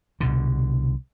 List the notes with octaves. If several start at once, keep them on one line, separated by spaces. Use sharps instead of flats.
C2 B2 D3